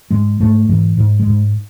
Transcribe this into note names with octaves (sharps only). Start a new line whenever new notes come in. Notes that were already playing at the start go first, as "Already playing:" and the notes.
G#2 G#3
G#2 A3
G#2 E3
G#2
G#3
G#2